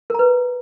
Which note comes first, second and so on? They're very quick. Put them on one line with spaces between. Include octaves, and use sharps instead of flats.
A#4 A#5 B4